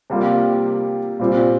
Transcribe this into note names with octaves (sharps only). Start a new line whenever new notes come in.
C3 G3 A#3 F4
A#2 G3 C4